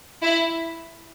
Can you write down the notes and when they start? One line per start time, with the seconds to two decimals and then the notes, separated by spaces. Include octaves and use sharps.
0.22 E4